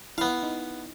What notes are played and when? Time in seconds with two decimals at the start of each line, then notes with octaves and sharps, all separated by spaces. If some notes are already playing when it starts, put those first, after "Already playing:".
0.18 B3 E4 F5
0.43 D#4